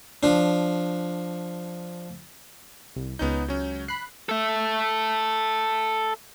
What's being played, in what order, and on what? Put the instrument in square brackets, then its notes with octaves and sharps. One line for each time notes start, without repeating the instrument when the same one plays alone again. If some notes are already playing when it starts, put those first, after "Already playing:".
[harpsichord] F3 D4
[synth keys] C2
[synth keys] C#2 G6 [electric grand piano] B3 C#4 D#4
[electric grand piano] F#3 C#4
[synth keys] B5 F#6 [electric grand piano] C7
[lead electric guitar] A4 E5